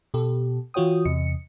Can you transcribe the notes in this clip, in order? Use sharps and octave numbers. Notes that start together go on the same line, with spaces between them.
B2 G4 A4
E3 F4 F#4 C#5 G5 D#6
E2 C3 D#5 C#7